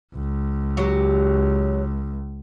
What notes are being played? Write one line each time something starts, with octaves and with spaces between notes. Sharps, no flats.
C#2
F#3 G4